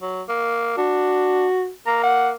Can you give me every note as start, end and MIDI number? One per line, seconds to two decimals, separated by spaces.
0.02 0.22 54
0.28 0.74 58
0.77 1.46 62
0.77 1.70 66
1.86 2.34 58
1.86 2.03 82
2.04 2.30 78